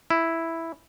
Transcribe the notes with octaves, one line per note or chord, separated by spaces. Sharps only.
E4